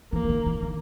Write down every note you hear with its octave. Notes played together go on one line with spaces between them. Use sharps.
E3 A#3
E3
D#3
E3
D#3